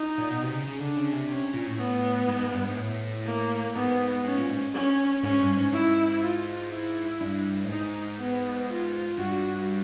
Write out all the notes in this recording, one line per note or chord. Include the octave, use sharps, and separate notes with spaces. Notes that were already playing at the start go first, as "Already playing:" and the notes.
Already playing: D#4
A#2
B2
C3
C#3
C#3
D3 D4
C#3
C3
C3 C#4
A#2
A2
B3
G#2
G#2
G2
G#2
A2
A#3
G#2 B3
G#2 C#4
A#2
G#2
C#4
G#2 C#4
G2
G#2
G#2 E4
F4
E4
G2
A2
G#2 D#4
B3
F4
G2 F#4